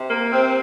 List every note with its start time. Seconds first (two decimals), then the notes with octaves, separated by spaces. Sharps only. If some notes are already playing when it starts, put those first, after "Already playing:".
Already playing: C3
0.08 A#3
0.31 C3 C4